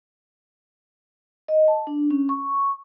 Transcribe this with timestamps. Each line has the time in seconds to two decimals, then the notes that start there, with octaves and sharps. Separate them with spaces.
1.48 D#5
1.68 A5
1.87 D4
2.10 C#4
2.29 C#6